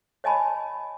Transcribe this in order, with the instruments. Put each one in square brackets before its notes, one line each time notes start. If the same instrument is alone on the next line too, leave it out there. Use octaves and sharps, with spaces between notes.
[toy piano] C#5 D#5 G#5 A5 B5